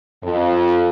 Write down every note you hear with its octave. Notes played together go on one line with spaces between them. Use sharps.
F2